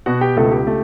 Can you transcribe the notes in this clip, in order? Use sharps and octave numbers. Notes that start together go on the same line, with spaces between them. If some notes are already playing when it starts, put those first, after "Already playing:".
B2 F#4 F#5
G4 G5
C#2 A3 A4
G4
A3